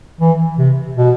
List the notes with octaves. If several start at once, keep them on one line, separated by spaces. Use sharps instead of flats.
E3
C3
B2